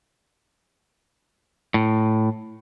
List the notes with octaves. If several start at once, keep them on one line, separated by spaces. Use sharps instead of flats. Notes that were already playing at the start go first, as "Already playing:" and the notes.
A2